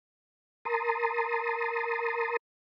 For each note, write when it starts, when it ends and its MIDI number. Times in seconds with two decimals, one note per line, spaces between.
0.65 2.37 70
0.65 2.37 81
0.65 2.37 82
0.65 2.37 84
0.65 2.37 87